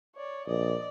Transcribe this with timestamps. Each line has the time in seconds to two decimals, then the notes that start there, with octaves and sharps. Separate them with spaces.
0.16 C#5 D5
0.47 A#1 D5 D#5